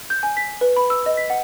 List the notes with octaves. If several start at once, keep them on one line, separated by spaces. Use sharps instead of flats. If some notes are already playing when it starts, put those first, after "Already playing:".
G6
G#5
B6
B4
B5
E6
D#5
B6
F#5